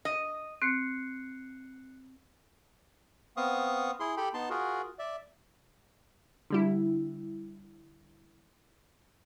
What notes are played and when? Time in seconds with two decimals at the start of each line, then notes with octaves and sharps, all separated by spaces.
0.05 D#5
0.62 C4 F#6 C7 C#7
3.37 B3 C4 F5 C#6 D#6
4.00 E4 G#4 C6
4.17 G4 A4 G5 B5
4.34 B3 D#4 A5 C6
4.50 F4 F#4 G#4 A#4
4.99 D5 E5
6.50 D3 G3 E4